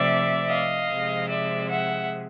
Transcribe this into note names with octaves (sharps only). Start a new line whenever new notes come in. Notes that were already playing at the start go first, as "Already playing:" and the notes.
Already playing: C3 F3 A3 D5 E5
D#5 F5
C3 F3 G#3
D5 E5
E5 F#5